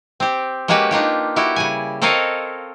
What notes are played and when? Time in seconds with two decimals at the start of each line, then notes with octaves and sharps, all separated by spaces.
0.20 C4 G4
0.68 G#3 A#3 C#4 F#4 G4 B4
0.91 D4 D#4 F4 G4
1.36 E4 F#4 G4
1.56 C#3 G3 G#5
2.02 C4 A4 A#4 C#5 D#5 F5